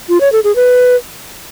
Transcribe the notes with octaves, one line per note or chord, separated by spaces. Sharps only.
F4
C#5
A4
G#4
B4